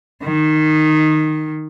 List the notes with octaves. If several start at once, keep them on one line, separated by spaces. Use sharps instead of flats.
D#3